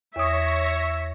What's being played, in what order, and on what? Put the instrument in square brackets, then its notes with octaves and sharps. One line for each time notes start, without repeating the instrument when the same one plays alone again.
[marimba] E2 D#6 [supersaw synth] C#5 C#6 A#6 [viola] E5